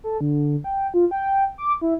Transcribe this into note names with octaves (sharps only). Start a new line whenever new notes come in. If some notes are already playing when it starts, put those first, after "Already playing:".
A4
D3
G5
F4
G5
D6
E4